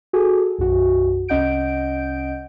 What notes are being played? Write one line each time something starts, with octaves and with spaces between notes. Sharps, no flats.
F#4 G#4 A4 G#5
B1 F#2 F#4
C2 C#4 D#5 F#5 G6 D7